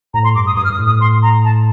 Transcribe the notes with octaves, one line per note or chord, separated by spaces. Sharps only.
A2 A#5
C6
G2 D6
D#6
G2 D#6
F6
G2 D#6
A2
D#6
C6
A#5
A5